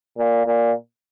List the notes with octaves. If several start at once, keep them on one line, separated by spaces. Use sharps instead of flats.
A#2
A#2